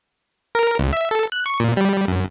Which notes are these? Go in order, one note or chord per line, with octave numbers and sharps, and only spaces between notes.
A#4
C#2
E5
A4
F#6
C#6
A#2
G3
F#2